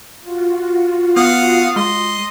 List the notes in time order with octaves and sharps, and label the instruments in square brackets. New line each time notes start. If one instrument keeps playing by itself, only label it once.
[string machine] F4 F#4
[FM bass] B3 [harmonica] F5 F#5 D#6
[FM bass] G#3 [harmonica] D#5 C6